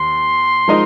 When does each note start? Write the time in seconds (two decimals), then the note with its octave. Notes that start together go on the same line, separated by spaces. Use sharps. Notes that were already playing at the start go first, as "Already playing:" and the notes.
Already playing: D#2 C6
0.68 F3 G#3 D#4 A#4 D#5